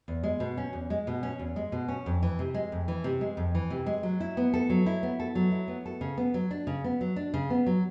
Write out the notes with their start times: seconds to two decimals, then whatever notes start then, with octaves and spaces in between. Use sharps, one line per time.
0.08 E2
0.23 G#3
0.40 B2
0.57 C#4
0.73 E2
0.90 G#3
1.07 B2
1.23 C#4
1.39 E2
1.56 G#3
1.72 B2
1.88 C#4
2.06 F2
2.23 E3
2.39 C3
2.54 G#3
2.72 F2
2.88 E3
3.04 C3
3.21 G#3
3.37 F2
3.55 E3
3.70 C3
3.86 G#3
4.03 F#3
4.20 E4
4.37 B3
4.54 A4
4.70 F#3
4.86 E4
5.03 B3
5.19 A4
5.35 F#3
5.52 E4
5.68 B3
5.86 A4
6.01 C#3
6.17 B3
6.34 F#3
6.51 D4
6.67 C#3
6.84 B3
7.01 F#3
7.16 D4
7.34 C#3
7.50 B3
7.66 F#3